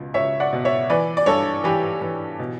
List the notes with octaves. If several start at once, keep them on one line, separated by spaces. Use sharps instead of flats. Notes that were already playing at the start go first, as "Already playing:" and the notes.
Already playing: C#2 B2
C#2 C#5 E5
D5 F#5
B2
C#5 E5
E3 B4 D5
D5
G2 A4 C#5
E3 G4 B4
E3
B2